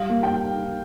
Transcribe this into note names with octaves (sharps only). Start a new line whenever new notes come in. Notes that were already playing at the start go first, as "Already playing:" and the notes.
Already playing: G3 F5
A#3
G5